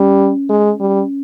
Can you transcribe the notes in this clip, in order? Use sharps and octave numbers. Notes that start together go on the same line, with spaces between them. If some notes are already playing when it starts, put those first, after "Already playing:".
Already playing: G3 C#4
G#3
G3